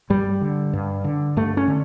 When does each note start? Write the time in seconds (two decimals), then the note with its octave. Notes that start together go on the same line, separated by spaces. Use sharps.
0.10 G2 G3
0.41 D3
0.73 G2
1.04 D3
1.37 G2 A3
1.57 C#4
1.68 D3